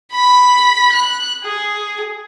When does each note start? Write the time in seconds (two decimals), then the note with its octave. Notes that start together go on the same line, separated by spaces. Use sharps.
0.12 B5 B6
0.93 F#6
1.44 G#4